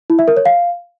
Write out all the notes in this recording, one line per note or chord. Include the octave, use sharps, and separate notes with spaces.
E4
E5
A#4
C#5
F5